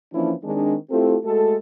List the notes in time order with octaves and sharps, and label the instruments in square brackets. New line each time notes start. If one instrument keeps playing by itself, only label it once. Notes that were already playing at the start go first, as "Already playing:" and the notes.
[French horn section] E3 F3 A#3 C#4 D4 E4
D#3 G#3 C4 D4
A3 C4 E4 F4 G4 A4
G#3 A3 F#4 A4